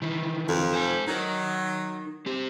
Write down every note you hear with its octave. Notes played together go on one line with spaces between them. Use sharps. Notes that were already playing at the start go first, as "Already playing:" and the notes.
D#3 E3
F2
C5 G#5
F#3 D#4 A#4
C4 G4